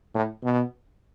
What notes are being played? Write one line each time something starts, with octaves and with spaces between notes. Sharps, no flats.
A2
B2